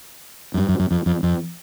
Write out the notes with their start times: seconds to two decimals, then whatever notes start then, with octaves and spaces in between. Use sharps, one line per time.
0.54 F#2
0.58 G2
0.68 F#2
0.80 F#2
0.91 F2
1.06 F2
1.23 F2